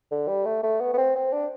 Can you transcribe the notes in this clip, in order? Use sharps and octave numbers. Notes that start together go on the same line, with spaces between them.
D3
G3
A3
A3
B3
B3
C4
C4
D4